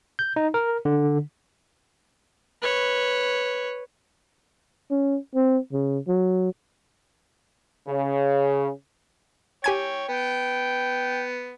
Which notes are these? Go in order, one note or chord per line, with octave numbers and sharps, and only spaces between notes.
G6
D#4
A#4
D3
B4 C#5
C#4
C4
C#3
F#3
C#3
G4 C#5 G5 G#5 G#6
B3 G5